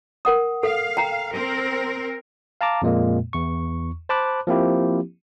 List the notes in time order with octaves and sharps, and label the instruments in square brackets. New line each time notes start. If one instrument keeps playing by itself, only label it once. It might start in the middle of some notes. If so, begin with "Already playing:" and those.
[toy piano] A#4 F#5 D#6
[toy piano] A4 [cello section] F5
[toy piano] G5 A#5
[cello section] C4 A#4
[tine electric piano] F5 A5 A#5 D6
F2 A#2 G#3 A#3
E2 C#6
C5 A5 B5 D6 F#6
F3 A#3 C4 E4 G4